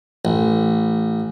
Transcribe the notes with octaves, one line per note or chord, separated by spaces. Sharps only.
A1